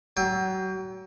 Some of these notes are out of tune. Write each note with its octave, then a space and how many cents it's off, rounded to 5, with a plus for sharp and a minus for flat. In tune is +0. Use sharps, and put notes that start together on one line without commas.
F#3 +35 G5 +25